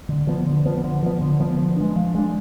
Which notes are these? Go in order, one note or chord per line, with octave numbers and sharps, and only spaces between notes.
D3
F3 B3
D3
F3 B3
D3
F3 B3
D3
F3 B3
F3
G#3 D4
F3
G#3 D4